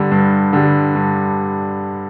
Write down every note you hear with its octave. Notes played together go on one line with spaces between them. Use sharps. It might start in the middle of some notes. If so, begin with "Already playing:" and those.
Already playing: G2 D3 G3
G2
D3 G3
G2